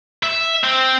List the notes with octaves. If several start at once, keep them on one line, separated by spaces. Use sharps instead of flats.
E5
C4